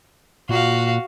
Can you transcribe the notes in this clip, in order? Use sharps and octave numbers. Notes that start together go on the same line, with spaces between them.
A#2 F#4 F5